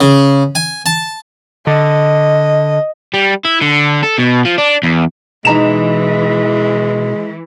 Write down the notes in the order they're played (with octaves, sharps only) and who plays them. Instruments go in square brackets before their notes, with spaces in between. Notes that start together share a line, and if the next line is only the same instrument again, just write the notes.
[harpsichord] C#3
G#5
A5
[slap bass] D3 [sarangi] D#5
[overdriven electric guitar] G3
E4
D3
A4
B2
F3
D4
E2
[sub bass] B2 [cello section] E3 [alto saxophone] G#3 [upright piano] D#4 A#5 E7